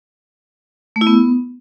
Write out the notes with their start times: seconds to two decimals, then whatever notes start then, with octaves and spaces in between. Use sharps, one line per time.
0.96 A3
1.01 E4
1.07 B3